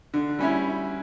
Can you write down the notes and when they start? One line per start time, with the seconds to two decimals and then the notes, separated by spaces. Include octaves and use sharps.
0.14 D3
0.39 G3 C#4 E4